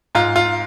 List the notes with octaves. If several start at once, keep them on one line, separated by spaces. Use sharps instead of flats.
G#2 F4
F4